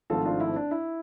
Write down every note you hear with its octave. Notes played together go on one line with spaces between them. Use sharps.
G#1 G#2 F3 A3 C4 F4 A4
D4 F4
E4
D4
E4